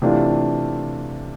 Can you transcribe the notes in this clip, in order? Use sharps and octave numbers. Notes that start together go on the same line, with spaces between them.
C3 E3 A3 D4 F4